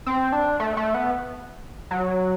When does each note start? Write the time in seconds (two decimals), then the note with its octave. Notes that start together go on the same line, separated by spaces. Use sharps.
0.06 C4
0.32 D4
0.60 A3
0.77 A3
0.94 B3
1.91 F#3